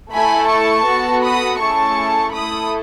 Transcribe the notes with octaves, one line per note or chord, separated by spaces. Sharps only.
A3 E4 A4 G#5 B5
A5 C#6
B3 F#4 A4
B5 D#6
A3 C#4 E4 G#4 A5 C#6
A3 E4 A4 B5 D#6